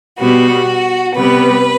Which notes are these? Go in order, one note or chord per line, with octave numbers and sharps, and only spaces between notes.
B2 G3 B3 F#4
C3 G3 B3 B4